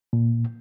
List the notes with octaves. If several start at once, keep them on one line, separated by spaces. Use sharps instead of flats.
A#2